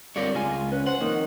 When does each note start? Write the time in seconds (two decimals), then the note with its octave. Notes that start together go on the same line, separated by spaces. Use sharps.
0.16 D3 G3 C4 F4 A#4 C#5 D5
0.35 C#2 G#3 F4 G#5
0.72 C#4 B4
0.86 C5 F#5
1.01 F2 D#3 A#3 C#5